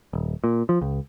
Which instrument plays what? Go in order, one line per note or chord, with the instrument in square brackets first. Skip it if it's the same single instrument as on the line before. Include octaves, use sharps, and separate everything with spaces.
[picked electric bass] D#1
A#2
F3
C#2